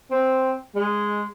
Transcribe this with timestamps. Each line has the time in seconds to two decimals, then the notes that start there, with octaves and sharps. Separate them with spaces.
0.10 C4
0.75 G#3